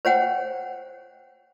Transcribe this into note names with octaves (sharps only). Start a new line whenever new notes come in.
C5 C#5 F#5 G5